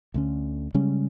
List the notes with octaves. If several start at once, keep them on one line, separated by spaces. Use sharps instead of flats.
D2 D3 C#4
C#3 G3 G#3 C#4